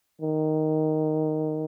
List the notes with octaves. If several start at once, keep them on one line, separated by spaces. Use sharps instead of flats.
D#3